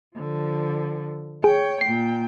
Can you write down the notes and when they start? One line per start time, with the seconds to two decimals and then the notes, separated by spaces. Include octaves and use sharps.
0.16 D3 F3
1.44 G#4 C#5 G5
1.81 A#2 G5 C7